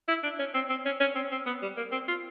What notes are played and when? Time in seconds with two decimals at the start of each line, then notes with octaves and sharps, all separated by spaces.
0.08 E4
0.23 D4
0.39 C#4
0.54 C4
0.70 C4
0.86 C#4
1.00 C#4
1.15 C4
1.32 C4
1.46 B3
1.62 G3
1.77 A#3
1.92 C4
2.08 F4